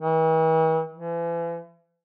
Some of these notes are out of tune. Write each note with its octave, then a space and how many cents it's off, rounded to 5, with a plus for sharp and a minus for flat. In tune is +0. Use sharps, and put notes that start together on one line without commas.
E3 -45
E3 +40